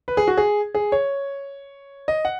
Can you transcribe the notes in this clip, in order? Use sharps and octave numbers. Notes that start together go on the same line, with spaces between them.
B4
G#4
F#4
G#4
G#4
C#5
D#5
F#5